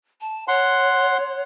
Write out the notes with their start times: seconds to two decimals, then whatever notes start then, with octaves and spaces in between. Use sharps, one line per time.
0.21 A5
0.48 C#5 F#5 C6